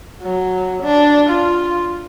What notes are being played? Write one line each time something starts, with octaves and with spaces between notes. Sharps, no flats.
F#3
D4
F4